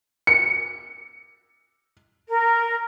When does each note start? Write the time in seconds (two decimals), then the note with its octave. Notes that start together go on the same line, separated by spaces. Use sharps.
0.27 C#7
2.29 A#4